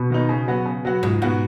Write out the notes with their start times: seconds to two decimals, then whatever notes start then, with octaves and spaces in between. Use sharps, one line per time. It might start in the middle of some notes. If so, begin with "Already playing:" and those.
Already playing: B2
0.10 D#3 B3 D#4
0.29 C#3
0.48 F#3 B3 F#4
0.65 C#3
0.85 F#3 B3 F#4
1.03 C#2 G#2
1.22 G#2 B2 B3 F#4